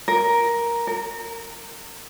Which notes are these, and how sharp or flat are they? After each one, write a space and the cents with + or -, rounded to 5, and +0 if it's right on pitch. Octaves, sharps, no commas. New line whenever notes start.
A#4 +10
A#4 -25